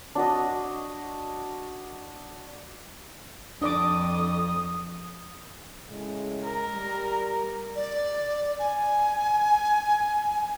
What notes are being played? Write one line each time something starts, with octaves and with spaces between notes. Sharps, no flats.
D4 F#4 D#5
F2 D4 D5 D6 D#6
A2 C#3 G#3
A#4
G3
D5
G#5